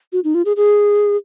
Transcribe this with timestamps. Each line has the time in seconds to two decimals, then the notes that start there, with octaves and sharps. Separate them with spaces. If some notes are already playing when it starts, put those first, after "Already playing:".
0.13 F#4
0.24 D#4
0.35 F4
0.45 G#4
0.57 G#4